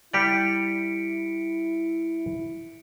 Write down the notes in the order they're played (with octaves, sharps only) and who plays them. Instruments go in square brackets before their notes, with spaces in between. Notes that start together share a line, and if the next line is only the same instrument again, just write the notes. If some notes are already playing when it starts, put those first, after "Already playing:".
[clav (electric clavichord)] G3 G4 D5 [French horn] E4 [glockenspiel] B6 C#7 D7